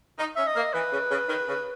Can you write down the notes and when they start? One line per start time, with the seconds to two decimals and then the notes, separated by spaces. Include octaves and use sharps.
0.19 D#4
0.36 C#4 E5
0.47 D#5
0.56 A#3
0.74 E3 B4
0.92 C#3
1.11 C#3
1.29 D#3
1.48 C#3